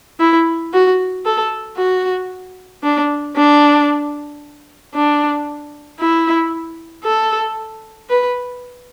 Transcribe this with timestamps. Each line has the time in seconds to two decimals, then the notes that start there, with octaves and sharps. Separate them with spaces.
0.20 E4
0.73 F#4
1.25 A4
1.77 F#4
2.83 D4
3.36 D4
4.95 D4
6.00 E4
7.04 A4
8.09 B4